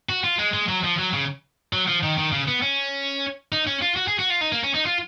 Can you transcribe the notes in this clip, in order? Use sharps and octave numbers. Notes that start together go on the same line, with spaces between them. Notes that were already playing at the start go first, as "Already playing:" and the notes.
F#4
F4
G#3
G#3
F#3
F3
F#3
C#3
F#3
F3
D#3
D#3
C#3
B3
C#4
D#4
C#4
F4
F#4
G#4
F#4
F4
D#4
A#3
C#4
D#4
F4